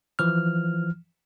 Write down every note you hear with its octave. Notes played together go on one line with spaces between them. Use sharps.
E3 F3 F6